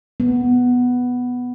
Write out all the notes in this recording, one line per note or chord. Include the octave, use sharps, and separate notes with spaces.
B3